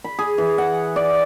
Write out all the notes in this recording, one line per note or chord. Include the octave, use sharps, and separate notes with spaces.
B5
G#4
E3
F#5
D5